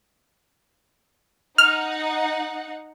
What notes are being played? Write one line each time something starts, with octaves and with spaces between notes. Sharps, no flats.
D#4 F#5 F6